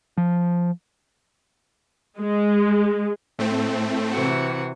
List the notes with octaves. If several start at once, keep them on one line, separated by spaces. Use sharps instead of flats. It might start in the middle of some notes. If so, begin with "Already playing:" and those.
F3
G#3
A2 A3 C4
C3 E3 F#4